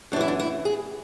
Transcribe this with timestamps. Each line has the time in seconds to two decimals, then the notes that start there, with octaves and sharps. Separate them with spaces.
0.12 F#2 D4
0.16 E3 E4
0.28 D4
0.40 E4
0.65 G#4